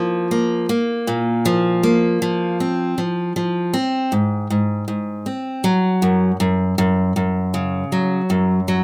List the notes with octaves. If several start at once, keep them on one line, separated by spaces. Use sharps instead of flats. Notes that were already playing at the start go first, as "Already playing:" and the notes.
Already playing: F3 A#3
A#3
A#3
A#2
F3
A#3
F3
C4
F3
F3
C4
G#2
G#2
G#2
C4
F#3
F#2
F#2
F#2
F#2
C#3
F#3
F#2
F#3